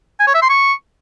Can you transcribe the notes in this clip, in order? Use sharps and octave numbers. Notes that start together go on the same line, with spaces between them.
G#5
C#5
E5
C6
C#6